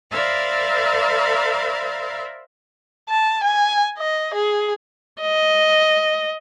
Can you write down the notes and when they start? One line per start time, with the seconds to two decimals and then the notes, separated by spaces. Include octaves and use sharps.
0.11 A#4 C5 D5 E5 F5 B5
3.09 A5
3.44 G#5
3.98 D#5
4.34 G#4
5.21 D#5